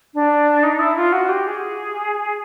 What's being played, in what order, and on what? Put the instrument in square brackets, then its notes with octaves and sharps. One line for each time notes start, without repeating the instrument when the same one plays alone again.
[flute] D4
D#4
E4
F4
F#4
G4
G#4